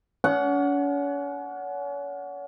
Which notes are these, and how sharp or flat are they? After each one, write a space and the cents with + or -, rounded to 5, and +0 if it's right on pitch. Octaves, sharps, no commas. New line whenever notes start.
C#4 +40 F#5 +0